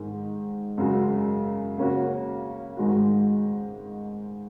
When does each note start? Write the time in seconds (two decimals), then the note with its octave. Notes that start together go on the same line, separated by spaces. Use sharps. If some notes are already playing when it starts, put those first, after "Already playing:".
Already playing: G#2 D#3 G#3
0.78 F#2 C#3 G#3 F#4
1.78 C#3 A#3 C#4 F#4
2.77 G#2 D#3 G#3 F#4